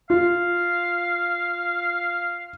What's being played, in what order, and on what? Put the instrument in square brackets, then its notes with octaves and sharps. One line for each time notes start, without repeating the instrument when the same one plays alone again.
[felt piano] F4 [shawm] F5